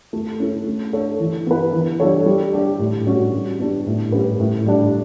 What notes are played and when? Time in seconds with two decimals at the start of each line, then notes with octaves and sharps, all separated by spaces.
0.13 A3
0.40 C#4 E4 A4
0.66 A3
0.93 D4 A4 C#5
1.20 E3
1.47 B3 E4 B4
1.73 E3
2.00 G3 D4 A4 C#5
2.26 G3
2.53 D4 G4
2.79 A2
3.06 G3 C#4 F#4
3.33 G3
3.60 B3 D4 G4
3.86 A2
4.12 G3 C#4 G4 B4
4.40 A2
4.66 G3 D4